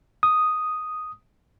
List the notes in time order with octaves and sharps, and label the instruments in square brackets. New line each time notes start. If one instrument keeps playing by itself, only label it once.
[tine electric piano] D#6